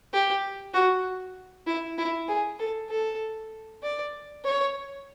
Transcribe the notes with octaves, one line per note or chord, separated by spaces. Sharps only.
G4
F#4
E4
E4
G#4
A4
A4
D5
C#5